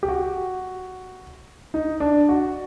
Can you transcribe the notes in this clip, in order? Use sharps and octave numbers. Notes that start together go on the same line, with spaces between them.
G4
F#4
D#4
D4
F#4